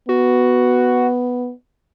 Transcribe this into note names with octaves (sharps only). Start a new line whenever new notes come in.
B3 F#4